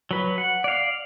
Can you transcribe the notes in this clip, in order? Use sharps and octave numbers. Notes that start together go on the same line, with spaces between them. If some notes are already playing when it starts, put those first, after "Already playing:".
F#3 B4
F#5
D5 F5